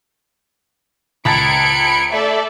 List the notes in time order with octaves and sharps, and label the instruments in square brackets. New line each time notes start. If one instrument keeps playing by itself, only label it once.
[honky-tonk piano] C#2 A5 A6 [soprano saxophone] B5 [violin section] G#6 C#7 D7
[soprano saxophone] A3 [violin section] A4 D5 E5